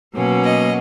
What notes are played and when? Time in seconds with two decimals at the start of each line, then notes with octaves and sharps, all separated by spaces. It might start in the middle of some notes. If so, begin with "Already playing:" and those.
0.15 B2 F#3 A#3 C#4
0.44 D#5